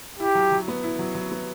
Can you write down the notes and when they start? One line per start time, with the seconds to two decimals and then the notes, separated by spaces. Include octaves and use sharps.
0.19 E4 G4
0.35 F#3
0.52 F#3
0.68 B3
0.84 E4
0.99 F#3
1.15 F#3
1.32 B3